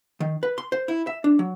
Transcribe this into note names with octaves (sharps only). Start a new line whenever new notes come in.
D#3
B4
C6
C5
E4
E5
D4
F#3